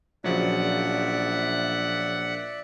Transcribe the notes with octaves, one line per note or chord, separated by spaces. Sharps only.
A#1 C#3 F3 F#3 D5 E5 F#5